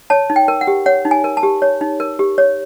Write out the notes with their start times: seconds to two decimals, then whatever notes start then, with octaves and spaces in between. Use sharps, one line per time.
0.10 C#5 A5
0.30 D#4
0.36 G5
0.48 A#4
0.61 F#5
0.67 G4
0.86 C#5 F#5
1.05 D#4
1.11 G#5
1.24 A#4
1.37 A5
1.43 G4
1.62 C#5
1.81 D#4
2.00 A#4
2.19 G4
2.38 C#5